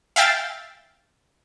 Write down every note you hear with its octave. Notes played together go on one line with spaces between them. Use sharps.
E5 F5 G5 A6